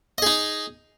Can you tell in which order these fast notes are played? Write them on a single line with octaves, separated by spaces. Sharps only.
D#5 G#4 D#4